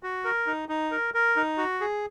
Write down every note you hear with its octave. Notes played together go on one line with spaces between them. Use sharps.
F#4
A#4
D#4
D#4
A#4
A#4
D#4
F#4
G#4